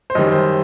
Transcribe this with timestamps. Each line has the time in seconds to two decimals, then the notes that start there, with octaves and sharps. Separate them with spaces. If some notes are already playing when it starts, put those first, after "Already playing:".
0.10 C5
0.15 F#2 D#3 G3 D#5
0.32 C5